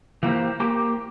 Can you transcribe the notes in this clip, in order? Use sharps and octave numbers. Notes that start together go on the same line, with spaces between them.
E3 A#3 G4 C5
A#3 G4